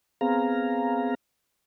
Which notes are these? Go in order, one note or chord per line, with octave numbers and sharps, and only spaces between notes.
B3 C4 G#4 F5 A#5